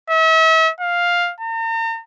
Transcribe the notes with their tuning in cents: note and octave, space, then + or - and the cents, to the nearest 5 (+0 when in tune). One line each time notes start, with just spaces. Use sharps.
E5 -40
F5 +5
A#5 -45